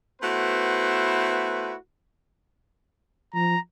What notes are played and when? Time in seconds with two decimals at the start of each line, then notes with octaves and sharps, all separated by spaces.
0.22 A3 B3 E4 F#4 B4 C5
3.34 F3 A#5